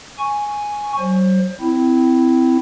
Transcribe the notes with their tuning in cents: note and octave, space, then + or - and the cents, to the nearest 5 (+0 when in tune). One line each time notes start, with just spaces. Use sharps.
G#5 +0 C#6 +0
F#3 +40 C5 +25
C4 -20 E4 +0